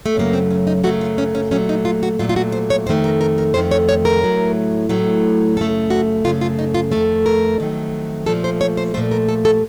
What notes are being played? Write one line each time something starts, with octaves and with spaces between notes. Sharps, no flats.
A3
F#2 C#3 F#3 A3 A#3
C4
C#4
D#4
F#2 C#3 F#3 A3 F#4
F4
C#4
C#4
A#2 F#3 A3 C#4
D#4
F4
F#4
A#2 F#3 A3 F4
F4
F#4
C5
C#5
F2 D#3 A3 C5
A#4
A#4
A#4
F2 D#3 A3 C5
C#5
C#5
A#4
A2 F#3 A3
A2 F#3 A3
F#2 C#3 A3 A4
F#4
F#2 C#3 A3 F4
F4
D#4
F4
F2 D#3 F#3 A3 A4
A#4
F2 D#3 F#3 A3
A#2 F3 A3 A4
C5
C#5
C5
A#2 F3 A3 C5
A#4
A4
A4